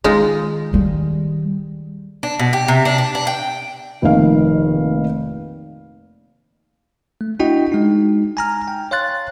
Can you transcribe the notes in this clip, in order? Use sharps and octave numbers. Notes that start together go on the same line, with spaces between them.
D#3 G#3 D#4 F4
D#3 G3
D4
B2
G4
C3
D4
D4
D4
G5
F1 A#1 D#3 F5
A3
D4 E4 F#4 D#5 G5
G#3 D#4
G#5 A#5 F6
G5
C#5 F5 C6 F#6 A6